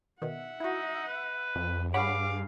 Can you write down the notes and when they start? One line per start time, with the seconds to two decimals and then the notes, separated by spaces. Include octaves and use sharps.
0.22 B2 D#3 E5 F#5
0.60 D#4 E4 F#4
1.07 B4
1.56 F2
1.94 G2 G#4 C#5 F5 F#5 B5 D6